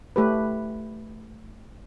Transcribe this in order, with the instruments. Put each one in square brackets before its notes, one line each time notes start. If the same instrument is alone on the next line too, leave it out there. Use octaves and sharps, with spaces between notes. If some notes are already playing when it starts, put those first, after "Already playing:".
[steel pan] A3 G4 B4